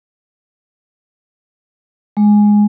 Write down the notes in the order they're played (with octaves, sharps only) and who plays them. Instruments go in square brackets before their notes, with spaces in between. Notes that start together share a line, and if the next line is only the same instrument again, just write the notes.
[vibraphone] G#3